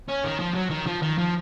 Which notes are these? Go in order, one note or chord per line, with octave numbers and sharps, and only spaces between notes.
C#4
D#3
F3
F#3
D#3
F3
D#3
F3